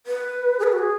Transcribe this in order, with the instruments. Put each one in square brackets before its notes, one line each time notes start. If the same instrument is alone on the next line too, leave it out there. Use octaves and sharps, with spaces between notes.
[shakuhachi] B4
G#4
B4
F#4
G#4